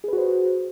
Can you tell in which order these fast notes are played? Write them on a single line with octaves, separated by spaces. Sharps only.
G#4 B4 F#4 C5